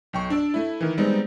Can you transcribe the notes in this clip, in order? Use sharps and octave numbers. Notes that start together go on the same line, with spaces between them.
B1 G5 C#6
D4 D5 E6
A3 E4
D#3 E3
G3 G#3 B3 C4 D#4